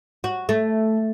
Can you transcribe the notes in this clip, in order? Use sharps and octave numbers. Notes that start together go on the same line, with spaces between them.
F#4
A3